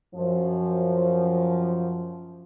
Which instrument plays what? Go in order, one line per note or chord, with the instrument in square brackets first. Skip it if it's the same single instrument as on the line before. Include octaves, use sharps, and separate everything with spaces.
[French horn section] F#2 F3